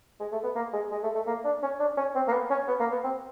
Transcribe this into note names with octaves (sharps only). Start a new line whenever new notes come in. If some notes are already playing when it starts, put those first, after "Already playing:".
G#3
A3
B3
A#3
G#3
G#3
A3
A3
A#3
D4
C#4
D4
C#4
C4
A#3
B3
C#4
B3
A#3
B3
C4